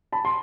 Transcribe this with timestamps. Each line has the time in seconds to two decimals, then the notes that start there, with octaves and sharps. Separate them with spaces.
0.12 A5 B5
0.25 C6